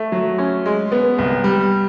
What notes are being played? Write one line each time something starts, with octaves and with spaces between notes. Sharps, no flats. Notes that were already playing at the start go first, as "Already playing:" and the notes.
Already playing: A3
F#3
C#4
G#3
B3
C2
G3